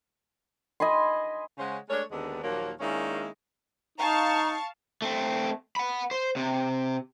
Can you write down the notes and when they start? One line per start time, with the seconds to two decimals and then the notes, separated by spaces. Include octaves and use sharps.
0.80 D#5 G#5 B5 C6
1.58 C#3 G#3 C#4 C5 C#5 F#5
1.89 G#3 A3 D4 A#4 C#5
2.11 D#2 D3 D#3 G#3 B3 D4
2.43 D#2 A#2 F3 F#3 A#3
2.80 D#3 G#3 A#3 C#4 D4 E4
3.98 D#4 F5 A5 A#5 C#6
5.02 A3 C4
5.76 F#5 B5
6.11 C5
6.36 C3